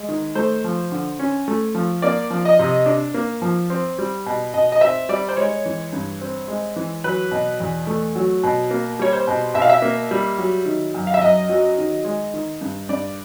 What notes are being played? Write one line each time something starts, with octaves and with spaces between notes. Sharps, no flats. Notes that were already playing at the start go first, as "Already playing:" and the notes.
Already playing: G#3
D#3
A3 C5
F3
D3
C#4
A3
F3
A#3 D5
F3
D#5
C3
D4
A#3
F3
C4
G3
B2
B2 D#5
D#5
C4 E5
G3 D5
C5
G#3 C#5
E3
G2
C4
G#3
E3
F#3 B4
B2
E2
A3
F#3
B2
A#3
G3 C#5
C5
B2
B2 E5
F5
E5
A#3
G3
F#3
D#3
F#2
F5
E5
F#2 D#5
F#3
D#3
G#3
D#3
G2
G2 D5